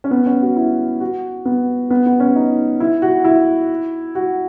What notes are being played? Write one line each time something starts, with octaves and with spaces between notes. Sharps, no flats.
C#4
B3
C#4
F#4
E4
F#4
B3
B3
B3
C#4
D#4
E4
F#4
E4
F#4